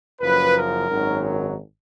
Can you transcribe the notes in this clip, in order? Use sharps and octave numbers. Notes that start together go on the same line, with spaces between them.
F#1 F#2 F3 B4
A#4
G#1 F#2 D#3 F#3